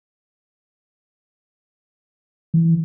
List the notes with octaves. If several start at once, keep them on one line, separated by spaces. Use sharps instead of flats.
E3